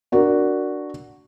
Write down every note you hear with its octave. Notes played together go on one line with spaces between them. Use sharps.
D4 F#4 A#4